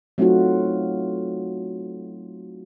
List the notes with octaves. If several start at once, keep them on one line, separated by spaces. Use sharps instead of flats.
F#3 A3 C4 D#4 F4 F#4